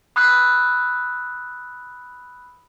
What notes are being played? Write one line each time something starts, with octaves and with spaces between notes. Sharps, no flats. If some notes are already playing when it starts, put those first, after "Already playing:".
B5 D#6 E6 F#6 G6 C7